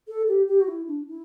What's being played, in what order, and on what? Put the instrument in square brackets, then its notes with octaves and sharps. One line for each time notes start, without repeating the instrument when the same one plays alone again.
[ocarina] A4
G4
G4
F#4
E4
D4
E4